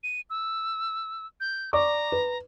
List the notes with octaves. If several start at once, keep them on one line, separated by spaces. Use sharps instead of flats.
D#7
E6
G6
D5 A#5 C#6 D6
B4